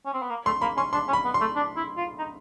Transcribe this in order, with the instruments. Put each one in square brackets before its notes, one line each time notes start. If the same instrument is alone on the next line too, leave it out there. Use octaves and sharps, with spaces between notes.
[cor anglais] C#4
C4
B3
A#3
[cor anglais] A3 [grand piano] C6
[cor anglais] A#3 [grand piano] B5
[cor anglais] C#4 [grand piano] C6
[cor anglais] D4 [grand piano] C6
[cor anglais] C#4
[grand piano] B5
[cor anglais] B3
[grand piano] C6
[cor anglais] A3
D4
E4
F4
D#4